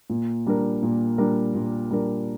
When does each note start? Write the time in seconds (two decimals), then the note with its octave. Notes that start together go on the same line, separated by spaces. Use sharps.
0.10 A#2
0.47 G3 D4 A#4
0.83 A#2
1.18 G3 D4 A#4
1.55 A#2
1.91 G3 D4 A#4